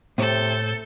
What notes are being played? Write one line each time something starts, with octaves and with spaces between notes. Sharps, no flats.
A2 C3 A4 G6